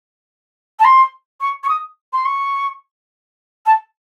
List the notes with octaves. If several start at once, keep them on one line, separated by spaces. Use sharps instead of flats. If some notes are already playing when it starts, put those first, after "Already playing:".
A5
C6
C#6
C#6
D#6
C6
C#6
A5